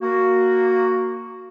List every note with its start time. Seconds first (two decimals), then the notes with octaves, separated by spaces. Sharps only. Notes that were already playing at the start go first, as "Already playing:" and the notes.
0.01 A#3 F#4